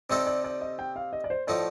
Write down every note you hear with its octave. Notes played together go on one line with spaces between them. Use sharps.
C3 G3 C4 D#4 A4 D5
D5
D5
D#5
G5
F5
D#5
D5
C5
A2 F3 A3 D#4 D5